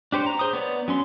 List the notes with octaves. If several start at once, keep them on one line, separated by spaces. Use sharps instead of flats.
D4 G4 C5 C#5
A#5
G#4 C5 A#5 D#6
B3 C#5 D5
F#3 C#4 C6